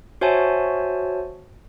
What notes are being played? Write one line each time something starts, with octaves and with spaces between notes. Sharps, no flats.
F#4 C5 C#5 E5 G#5 A5